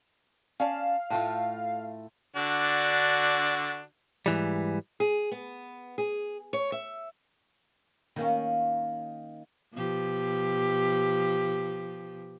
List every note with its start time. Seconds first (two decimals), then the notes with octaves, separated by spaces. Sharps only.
0.60 C#4 D5 F5 A5
1.10 A2 A3 F4
2.36 D3 D4 F#4
4.26 G#2 E3 G3
5.00 G#4
5.32 B3
5.98 G#4
6.53 C#5
6.72 E5
8.16 D#3 A#3 C#4
9.73 B2 F3 G4